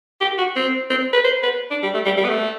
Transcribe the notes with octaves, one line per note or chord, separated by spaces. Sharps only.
G4
F#4
C4
C4
B4
C5
B4
D4
G3
A3
G3
G3
B3
A3